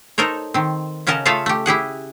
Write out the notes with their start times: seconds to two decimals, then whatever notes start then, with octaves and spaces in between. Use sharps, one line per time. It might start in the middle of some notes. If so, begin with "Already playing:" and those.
0.18 D#4 A4 A#4 C5 C#5
0.54 D#3 C4
1.07 C#3 C#4 F#4 A#4 D#5 A5
1.25 A3 F4 G#4 A4 E5 F5
1.46 A3 G4
1.66 E4 G4 G#4 F#5